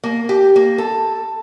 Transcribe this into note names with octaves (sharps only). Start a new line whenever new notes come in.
A#3
G4
A#3
A4